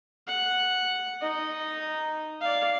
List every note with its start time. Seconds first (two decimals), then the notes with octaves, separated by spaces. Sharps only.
0.27 F#5
1.21 D#4 D#5
2.41 D5 F5